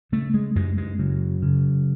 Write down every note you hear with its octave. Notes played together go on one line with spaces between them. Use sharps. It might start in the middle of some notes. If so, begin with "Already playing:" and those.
C#3 A3
G#3
F#2 G#3
G#3
C#3 F#3
C#3